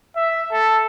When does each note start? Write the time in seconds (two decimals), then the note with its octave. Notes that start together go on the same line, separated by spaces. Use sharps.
0.16 E5
0.52 A4